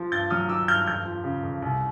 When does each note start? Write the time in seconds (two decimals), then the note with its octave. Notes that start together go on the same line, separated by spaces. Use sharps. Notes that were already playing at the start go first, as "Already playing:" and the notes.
Already playing: F3
0.12 G2 G6 A6
0.30 F#3 D#6 F6
0.49 D#3 D6 E6
0.68 G2 F6 G6
0.86 F2 F6 G6
1.05 F3
1.24 C#3
1.43 F2
1.62 C2